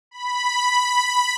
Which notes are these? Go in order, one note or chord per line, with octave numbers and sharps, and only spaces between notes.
B5